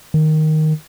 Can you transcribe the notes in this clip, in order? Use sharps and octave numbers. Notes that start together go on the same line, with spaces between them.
D#3